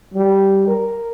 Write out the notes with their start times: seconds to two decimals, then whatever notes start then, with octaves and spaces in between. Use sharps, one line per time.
0.14 G3
0.67 A#4